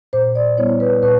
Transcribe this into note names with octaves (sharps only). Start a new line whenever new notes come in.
A#2 C5
D5
G3 B3 E4 C#5
B4
A#2 B4